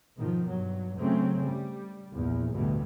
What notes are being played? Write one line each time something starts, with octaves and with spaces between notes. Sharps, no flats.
G#2 B2 D#3 F3
G2 F#3
C#3 F#3 A3 C4 C#4
G3
A#1 E2
A1 D2 G2 B2